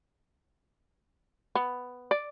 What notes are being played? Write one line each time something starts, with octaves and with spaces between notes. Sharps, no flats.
B3
D5